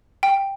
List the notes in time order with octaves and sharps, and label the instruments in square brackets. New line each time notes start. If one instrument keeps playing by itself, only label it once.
[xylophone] G5